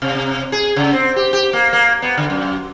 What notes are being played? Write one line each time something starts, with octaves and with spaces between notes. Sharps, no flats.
C3
C3
G#4
C#3
C4
G4
G4
A#3
A#3
B3
D3
F#2